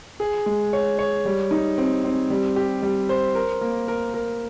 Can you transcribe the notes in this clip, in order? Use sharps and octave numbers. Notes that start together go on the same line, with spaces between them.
G#4
G#3
C#5
C#5
G3
D#4
C4
C4
G3
G4
G3
C5
A#4
A#3
A#4
A#4